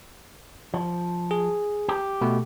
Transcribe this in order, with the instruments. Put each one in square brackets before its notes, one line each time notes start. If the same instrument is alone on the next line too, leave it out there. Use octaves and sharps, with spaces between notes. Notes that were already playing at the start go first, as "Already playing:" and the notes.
[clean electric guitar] F3
[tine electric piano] G#4
[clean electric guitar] G4
[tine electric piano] B2 A3